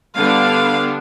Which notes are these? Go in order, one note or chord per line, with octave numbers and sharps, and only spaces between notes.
D3 G3 B3 D4 F5